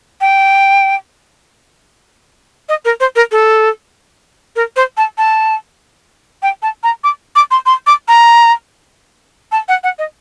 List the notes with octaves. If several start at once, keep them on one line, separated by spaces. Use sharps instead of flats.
G5
D#5
A#4
C5
A#4
A4
A#4
C5
A5
A5
G5
A5
A#5
D6
D6
C6
C6
D6
A#5
A5
F#5
F#5
D#5